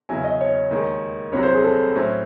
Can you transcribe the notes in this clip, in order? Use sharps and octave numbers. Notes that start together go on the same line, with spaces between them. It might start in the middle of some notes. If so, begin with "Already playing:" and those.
E2 C#3 F#3 C#4 E4 G#5
D#5
C#5
D#2 D#3 G#3
C2 C3 F#3 C#5
C5
G#4
A4
A2 F#3 C#4 E4 C5